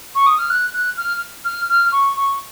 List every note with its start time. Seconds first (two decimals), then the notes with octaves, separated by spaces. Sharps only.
0.15 C#6
0.27 D#6
0.38 F6
0.50 F#6
0.74 F#6
0.97 F6
1.45 F6
1.69 F6
1.92 C#6
2.16 C#6